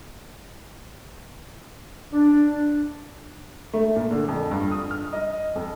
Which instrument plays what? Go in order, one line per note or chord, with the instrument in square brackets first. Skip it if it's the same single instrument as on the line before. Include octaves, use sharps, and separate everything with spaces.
[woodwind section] D4
[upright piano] A3
A#2
D3
F2
G2
D#6
F6
D#5
F2